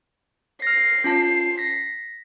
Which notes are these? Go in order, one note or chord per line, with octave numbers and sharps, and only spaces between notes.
F6 A#6 C7
C#4 F4 A5
A#6 B6